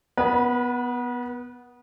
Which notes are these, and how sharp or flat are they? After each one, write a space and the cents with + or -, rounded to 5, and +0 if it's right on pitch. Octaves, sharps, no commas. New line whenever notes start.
B3 +0 B4 -35